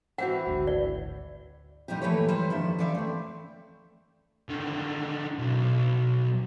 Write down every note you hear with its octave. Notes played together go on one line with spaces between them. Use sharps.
E3 C4 F#4 F#5
G#1 D2
D5
A#2 G3 D#4 E4 G4
E3 A3 A#3 G4 B4 C#5
G3 E4 B4 C5
F2 D#3 D4 E5
E3 C4 D5 E5 F5
A3 C4
D3 D#3
B1